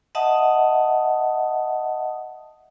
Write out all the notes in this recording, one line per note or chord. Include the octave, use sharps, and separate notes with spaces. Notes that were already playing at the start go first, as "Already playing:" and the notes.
D#5 E5 F#5 A5 D#6